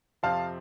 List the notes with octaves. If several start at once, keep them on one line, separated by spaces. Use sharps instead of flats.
F2 C3 F3 C4 F5 A5